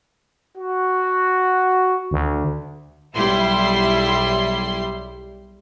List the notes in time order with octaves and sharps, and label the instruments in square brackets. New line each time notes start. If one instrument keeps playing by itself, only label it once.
[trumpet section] F#4
[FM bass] D2
[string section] B1 G3 E4 C6